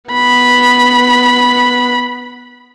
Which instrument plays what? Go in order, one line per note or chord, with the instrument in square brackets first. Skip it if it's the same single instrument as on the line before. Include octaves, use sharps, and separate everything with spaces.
[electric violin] B3 B5